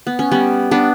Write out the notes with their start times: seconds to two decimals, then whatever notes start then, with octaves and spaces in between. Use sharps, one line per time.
0.07 B3
0.19 C#4
0.31 G3 B3
0.71 B3 D4